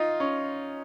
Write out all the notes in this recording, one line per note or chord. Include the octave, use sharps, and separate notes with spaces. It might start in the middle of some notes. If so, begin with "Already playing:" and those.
Already playing: D#4 F4
C#4